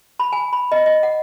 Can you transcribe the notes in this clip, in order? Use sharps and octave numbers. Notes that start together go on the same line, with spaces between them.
B5
G#5
B5
D#5
D#5
F#5